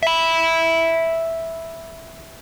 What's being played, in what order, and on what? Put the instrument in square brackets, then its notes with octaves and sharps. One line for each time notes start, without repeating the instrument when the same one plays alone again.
[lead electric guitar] E5 B5